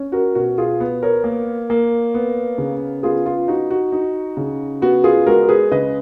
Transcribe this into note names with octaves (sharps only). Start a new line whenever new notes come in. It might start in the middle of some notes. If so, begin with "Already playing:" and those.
Already playing: C#4
F#4 A#4
B2 F#4
F4 G#4
B3
A#4 C#5
A#3
A#3
B3
C#3
B3 F4 G#4
F4
D#4 F#4
F#4
D#4
C#3
B3 F#4
F4 G#4
G#3 F#4 A#4
G#4 B4
C#3 B4 D#5